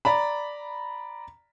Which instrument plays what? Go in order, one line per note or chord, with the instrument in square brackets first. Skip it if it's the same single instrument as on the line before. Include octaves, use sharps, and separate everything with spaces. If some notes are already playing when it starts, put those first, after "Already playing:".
[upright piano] D5 A#5 B5